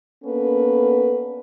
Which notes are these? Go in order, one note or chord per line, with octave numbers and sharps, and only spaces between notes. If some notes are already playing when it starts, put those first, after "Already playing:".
A#3 B3 C#4 D4 A4 B4